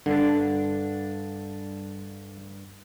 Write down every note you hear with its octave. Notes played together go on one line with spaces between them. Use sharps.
G2 D3 D4